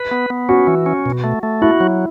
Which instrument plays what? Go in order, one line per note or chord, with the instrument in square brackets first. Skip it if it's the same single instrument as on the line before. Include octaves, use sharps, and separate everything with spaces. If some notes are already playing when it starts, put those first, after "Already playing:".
Already playing: [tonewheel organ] B4
B3
B3
[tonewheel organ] C#4 [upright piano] F#4
[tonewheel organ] E3
C#4
B2
A3
A3
[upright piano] E4 [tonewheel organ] F#4
[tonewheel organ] F#3